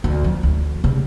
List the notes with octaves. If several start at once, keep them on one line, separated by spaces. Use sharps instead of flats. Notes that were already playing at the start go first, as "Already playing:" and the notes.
D2
F3
D2
C#3 G3